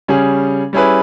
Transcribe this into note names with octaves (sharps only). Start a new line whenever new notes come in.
C#3 G3 C#4 G#4
G3 C#4 E4 G#4 B4